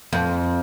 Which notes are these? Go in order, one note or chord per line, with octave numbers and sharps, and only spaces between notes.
F2